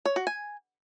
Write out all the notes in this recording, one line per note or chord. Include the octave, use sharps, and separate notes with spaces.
C#5
F#4
G#5